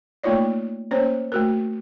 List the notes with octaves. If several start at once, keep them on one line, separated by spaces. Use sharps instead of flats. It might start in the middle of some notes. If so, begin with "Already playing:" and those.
A3 A#3 D#4 F4 C#5 D5
A#3 C#4 C5 C#5
A3 F#4 A#4